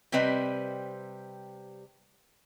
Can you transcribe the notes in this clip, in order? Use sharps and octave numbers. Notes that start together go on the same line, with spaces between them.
C3 G3 C4 B4 D#5